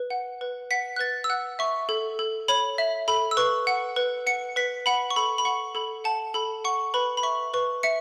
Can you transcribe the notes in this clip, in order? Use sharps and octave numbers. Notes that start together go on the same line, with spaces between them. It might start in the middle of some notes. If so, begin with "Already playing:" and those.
Already playing: B4
F#5
B4
F#5 B6
F#6
B4 A6
E6
F#5 F#6
E5 C#6
A4
A4
C#5 B5
E5
A4 B5
E6
B4 C#6
F#5
B4
F#5 C#7
B4 B6
F#5 B5
C#6
A4 B5
B5
F#5 C#6
A4 B5
F#5 A5
A4 B5
F#5 C#6
B4 B5
B5
E5 C#6
B4 C#6
E5 C#7